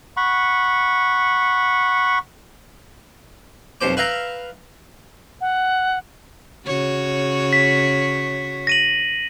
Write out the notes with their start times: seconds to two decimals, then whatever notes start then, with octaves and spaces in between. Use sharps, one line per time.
0.17 F#5 B5 C#6
3.81 B1 F2 C5 D6
3.97 B4 E5 F5 G5 A#5
5.41 F#5
6.66 C#3 F#4 C#5
7.53 B6
8.67 A#6 D#7 F#7